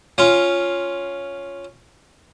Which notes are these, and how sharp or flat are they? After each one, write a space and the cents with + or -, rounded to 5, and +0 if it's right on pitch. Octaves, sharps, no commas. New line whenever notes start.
C#4 +0 F4 +0